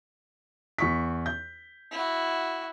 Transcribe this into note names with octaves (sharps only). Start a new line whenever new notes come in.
E2 C#6 B6
G6
E4 F#4